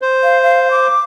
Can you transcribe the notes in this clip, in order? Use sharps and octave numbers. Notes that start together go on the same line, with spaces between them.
C5
F5
F5
D6